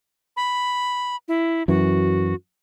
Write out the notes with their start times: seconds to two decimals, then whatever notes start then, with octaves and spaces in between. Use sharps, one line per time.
0.37 B5
1.28 E4
1.68 F#2 E3 F#4